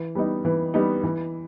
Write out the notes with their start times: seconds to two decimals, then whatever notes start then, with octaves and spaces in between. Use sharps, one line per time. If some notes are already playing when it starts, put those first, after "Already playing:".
Already playing: E3
0.15 G3 B3 D#4
0.45 E3
0.74 G3 B3 D#4
1.03 E3